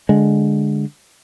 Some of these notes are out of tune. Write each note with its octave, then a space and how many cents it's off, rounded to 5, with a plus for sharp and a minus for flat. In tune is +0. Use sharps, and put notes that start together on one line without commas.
D3 +0 G#3 +0